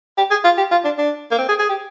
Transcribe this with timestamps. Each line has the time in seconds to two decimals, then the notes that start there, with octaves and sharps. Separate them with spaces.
0.17 G4
0.30 G#4
0.44 F4
0.57 G4
0.71 F4
0.85 D4
0.98 D4
1.31 A#3
1.38 C4
1.49 G#4
1.59 G#4
1.69 G4